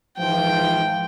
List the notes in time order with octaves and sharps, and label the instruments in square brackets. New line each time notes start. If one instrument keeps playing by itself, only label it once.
[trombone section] G#2 E3 F3 [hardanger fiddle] G5